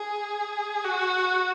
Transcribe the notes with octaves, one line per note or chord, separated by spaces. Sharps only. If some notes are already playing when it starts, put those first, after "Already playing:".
Already playing: G#4
F#4